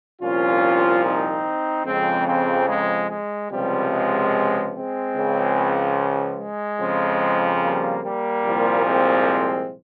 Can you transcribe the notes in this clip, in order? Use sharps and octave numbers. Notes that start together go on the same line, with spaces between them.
C2 A#2 F3 C#4 F4
C4 D#4
F2 C#3 F3 G#3 C4
G#3 C4
G#3
G#3
C#2 C3 F3 G3
G#3
G#3 C4
C#2 C#3 F3
G#3
F2 C#3 F3
G3 A#3
G3 A#3
C2 A#2 F3
G#3 C4